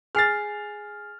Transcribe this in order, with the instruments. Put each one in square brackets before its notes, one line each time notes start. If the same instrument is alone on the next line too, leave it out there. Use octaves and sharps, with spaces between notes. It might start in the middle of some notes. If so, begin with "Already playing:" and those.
[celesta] G#4 G#5 C7 [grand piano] F6 A6